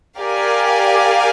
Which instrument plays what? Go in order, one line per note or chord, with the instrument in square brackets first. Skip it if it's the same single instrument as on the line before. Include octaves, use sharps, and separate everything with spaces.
[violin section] G4 A#4 D5 F5 G#5